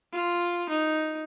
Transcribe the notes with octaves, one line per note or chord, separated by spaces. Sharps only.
F4
D#4